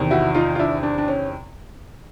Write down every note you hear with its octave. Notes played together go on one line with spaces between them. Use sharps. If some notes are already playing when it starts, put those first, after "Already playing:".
Already playing: E2 C3 D#3
E4 F#4
D#4 F4
F4
D4 E4
D4
D4
C#4